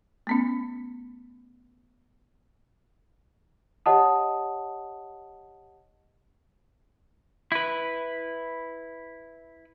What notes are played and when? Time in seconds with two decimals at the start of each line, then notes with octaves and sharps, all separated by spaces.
0.27 A3 B3 C#4
3.86 G4 C#5 D#5 F#5 A5 D#6
7.52 E4 B4